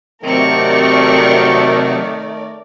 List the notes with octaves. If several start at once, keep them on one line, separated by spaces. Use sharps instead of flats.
C3 D#3 F#3 A3 C4 A#4 D5 C#6